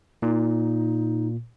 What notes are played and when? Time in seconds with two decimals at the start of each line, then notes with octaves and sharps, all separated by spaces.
0.22 A#2 D#4